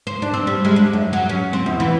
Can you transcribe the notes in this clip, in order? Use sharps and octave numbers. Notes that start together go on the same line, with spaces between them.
C5
D4
C4
G3
G#3
D4
F#2
F#3
C#4
C4
E2
E3